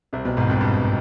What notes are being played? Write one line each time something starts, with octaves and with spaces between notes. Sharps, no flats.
C2 C3
B1 B2
G#1 G#2
F2
G2